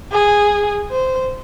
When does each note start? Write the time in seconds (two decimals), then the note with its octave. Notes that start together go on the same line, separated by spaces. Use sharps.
0.12 G#4
0.91 C5